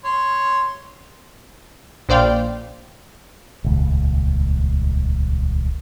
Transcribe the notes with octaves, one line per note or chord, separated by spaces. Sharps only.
C#5 C6
A#1 C5 D5 F5 G5
D#1 C#2